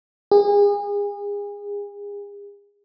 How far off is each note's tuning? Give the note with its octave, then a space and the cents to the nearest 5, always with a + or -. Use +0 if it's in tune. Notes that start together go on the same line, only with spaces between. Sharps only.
G#4 -35